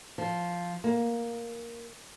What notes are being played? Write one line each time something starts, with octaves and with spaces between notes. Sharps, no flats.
F3
A#3